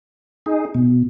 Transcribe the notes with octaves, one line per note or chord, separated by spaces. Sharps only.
D#4 G#4
B2